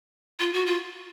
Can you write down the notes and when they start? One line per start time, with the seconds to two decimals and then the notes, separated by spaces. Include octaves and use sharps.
0.40 F4
0.53 F#4
0.66 F4